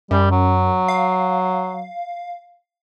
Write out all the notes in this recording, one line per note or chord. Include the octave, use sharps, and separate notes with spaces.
F#2 G3
F#3
F5